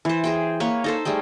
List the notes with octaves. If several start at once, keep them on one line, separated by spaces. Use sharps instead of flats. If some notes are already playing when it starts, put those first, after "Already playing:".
E3 C5
G#4 C5 G5
A#3 B4 C#5
D#4 A4 C5
G3 A3 G#4 G5